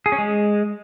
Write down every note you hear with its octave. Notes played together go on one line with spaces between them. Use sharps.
G#4
C#4
G#3